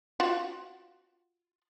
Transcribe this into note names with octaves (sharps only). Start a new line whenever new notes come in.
F4 F#4